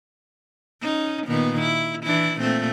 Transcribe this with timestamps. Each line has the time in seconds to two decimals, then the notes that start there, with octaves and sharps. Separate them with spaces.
0.82 C#4 D#4
1.27 A#2 D#3 B3
1.61 E4
2.04 E3 D4 E4
2.39 A#2 A3 C4